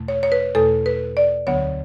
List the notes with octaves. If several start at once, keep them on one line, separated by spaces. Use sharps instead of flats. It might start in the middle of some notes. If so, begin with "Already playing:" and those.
Already playing: E2 B2 A3
C#5
C#5
B4
E2 B2 A3 A4
B4
D5
D2 D3 F#3 B3 C#5